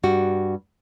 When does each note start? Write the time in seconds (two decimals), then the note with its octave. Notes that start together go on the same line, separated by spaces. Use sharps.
0.03 G2 G3 F#4